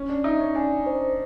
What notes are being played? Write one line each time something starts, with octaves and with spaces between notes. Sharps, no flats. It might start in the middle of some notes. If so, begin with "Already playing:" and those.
Already playing: C#4
D4
D#4 E5
C#4
D4 G#5
C5